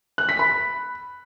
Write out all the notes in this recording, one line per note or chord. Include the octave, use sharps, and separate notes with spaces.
F#6
B6
B5